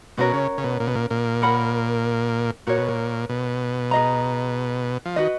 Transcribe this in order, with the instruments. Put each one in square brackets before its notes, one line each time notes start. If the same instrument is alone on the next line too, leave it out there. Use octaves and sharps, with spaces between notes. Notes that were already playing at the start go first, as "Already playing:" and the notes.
[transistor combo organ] B2 [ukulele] C#4 F#4 A#4 C#5
[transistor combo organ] C#3
C#3
B2
A#2
B2
A#2
A#2
[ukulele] A#4 C#5 F#5 B5
[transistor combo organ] A#2 [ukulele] F#4 A#4 C#5
[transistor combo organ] B2
A#2
B2
[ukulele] G#4 D#5 A#5
[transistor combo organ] F3
[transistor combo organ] D#3 [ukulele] F#4 B4 D#5